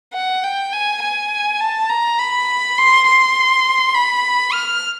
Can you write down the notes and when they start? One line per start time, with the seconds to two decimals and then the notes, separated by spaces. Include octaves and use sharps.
0.14 F#5
0.43 G5
0.73 G#5
1.02 G#5
1.60 A5
1.89 A#5
2.19 B5
2.78 C6
3.06 C6
3.94 B5
4.53 F6